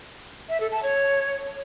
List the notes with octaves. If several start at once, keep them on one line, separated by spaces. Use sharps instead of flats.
E5
A4
A5
C#5